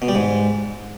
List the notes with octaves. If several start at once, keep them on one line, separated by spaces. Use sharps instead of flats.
B2
G3
G#2